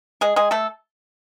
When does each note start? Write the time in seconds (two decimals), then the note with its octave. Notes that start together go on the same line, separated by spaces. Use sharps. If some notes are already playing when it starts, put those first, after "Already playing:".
0.21 G#3 G#4
0.36 G#3 G#4
0.51 A3 A4